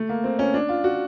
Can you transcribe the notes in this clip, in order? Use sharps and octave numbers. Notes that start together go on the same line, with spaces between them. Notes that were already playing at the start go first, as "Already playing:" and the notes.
Already playing: A3
A#3
C4
C#4
D4
F4
F#4